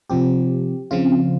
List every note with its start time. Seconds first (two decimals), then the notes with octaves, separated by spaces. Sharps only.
0.10 C3 F3 C4 G4
0.91 C#3 F3 C4 F4